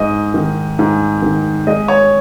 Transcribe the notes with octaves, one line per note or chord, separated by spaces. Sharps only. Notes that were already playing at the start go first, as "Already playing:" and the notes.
Already playing: G#2 D#5
D#3
G#2
D#3
G#3 D#5
C#5